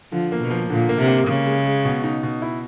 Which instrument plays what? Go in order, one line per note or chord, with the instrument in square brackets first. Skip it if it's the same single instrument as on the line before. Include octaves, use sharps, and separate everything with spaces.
[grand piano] D3 [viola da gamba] F3
[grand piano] A#3
[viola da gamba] B2
[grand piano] F3
[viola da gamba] A#2 [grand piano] D3
[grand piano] A#3
[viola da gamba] C3
[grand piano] A#3
[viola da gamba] C#3 [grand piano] G#3
[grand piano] G#3
G#3
B2
D#4
B2
E4